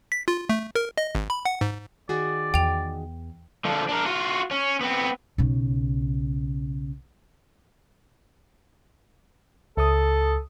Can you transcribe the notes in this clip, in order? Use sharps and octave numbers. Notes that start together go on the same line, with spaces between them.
B6
F4
A3
A#4
D#5
G#1
B5
F#5
G#2
D#3 F#4 G#4 D5
E2 G5 F7
D3 F3
D4 A#4
F4 F#4
C#4
B3 C4
B1 C#3
C#2 A4 D#6